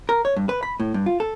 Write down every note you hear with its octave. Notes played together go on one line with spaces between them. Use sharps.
A#4
C#5
G2
B4
B5
A2
G2
F4
A4